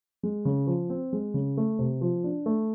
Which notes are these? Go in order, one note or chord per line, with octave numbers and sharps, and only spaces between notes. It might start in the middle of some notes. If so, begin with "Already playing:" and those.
G#3
C#3
F3
C4
G#3
C#3
A3
C3
F3
D4
A3